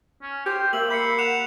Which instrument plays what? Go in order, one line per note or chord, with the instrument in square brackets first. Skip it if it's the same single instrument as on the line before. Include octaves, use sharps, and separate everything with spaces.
[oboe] C#4
[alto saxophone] G4 [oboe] C5
[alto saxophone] A#3 [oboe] E5 [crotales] F#7
[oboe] B5 [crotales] G6 C7 C#7
[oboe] F#5 [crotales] C#7 E7 F7